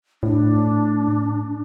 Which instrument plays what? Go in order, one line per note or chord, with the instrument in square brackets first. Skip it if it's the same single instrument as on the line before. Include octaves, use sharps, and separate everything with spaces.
[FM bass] A2 [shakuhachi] D4